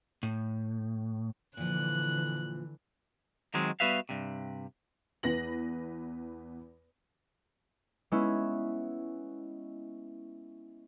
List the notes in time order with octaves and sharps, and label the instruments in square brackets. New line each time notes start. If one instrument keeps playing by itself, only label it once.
[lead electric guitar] A2
[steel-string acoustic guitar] A#2 F3 [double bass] D3 E3 [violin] F#6
[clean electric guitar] D#3 F#3 G#3 C4
G3 B3 F#4 B4 E5 F5
G2 C3
[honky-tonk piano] E2 B4 A#6 F#7
[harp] G#3 B3 C#4 E4